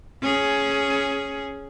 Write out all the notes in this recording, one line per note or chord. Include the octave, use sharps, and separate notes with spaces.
C#4 G#4